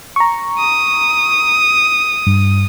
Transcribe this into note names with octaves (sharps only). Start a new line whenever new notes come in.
A#5 C#6
D#6
G2